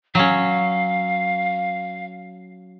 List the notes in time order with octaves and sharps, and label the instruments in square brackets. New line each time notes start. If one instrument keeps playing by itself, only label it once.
[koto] F#3 C#4 [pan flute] F5